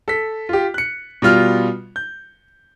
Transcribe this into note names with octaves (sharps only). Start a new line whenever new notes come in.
A4 B6
F4 G4
F#6 C#7
B2 G3 F4 F6
G6